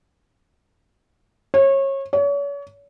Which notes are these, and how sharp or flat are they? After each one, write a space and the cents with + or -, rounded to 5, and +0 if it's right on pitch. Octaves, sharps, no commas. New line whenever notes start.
C#5 -25
C#5 +40